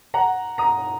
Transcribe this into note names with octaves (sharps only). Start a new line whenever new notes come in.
F#5 A#5
A#5 D#6